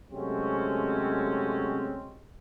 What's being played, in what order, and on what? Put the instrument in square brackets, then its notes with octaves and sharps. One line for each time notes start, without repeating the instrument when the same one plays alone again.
[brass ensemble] C3 F#3 G#3 A3 C4 C#4